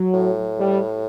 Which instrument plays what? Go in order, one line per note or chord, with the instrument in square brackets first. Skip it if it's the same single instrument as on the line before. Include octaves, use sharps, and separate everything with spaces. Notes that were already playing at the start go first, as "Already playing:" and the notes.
Already playing: [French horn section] F#3
[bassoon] A2
[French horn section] G3